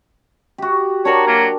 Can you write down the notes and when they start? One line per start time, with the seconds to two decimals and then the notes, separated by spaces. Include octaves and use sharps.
0.58 F#4 G4
1.05 D4 F#4 A#4 C#5
1.27 F#3 A#3